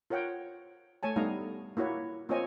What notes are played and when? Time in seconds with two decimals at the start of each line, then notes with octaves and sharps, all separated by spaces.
0.10 F4 A#4 C#5 F#5 G5
1.03 A3 C#5 G#5 A5
1.16 G3 A3 B3 D#4 F5 A#5
1.77 A#3 E4 F#4 C#5
2.29 A#3 C4 F4 C#5 D#5 G#5